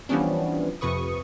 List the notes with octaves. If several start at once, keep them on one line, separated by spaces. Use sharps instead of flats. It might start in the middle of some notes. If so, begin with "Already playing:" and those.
E3 F3 G3 B3 C#4 D4
F2 C3 B4 C#6 D#6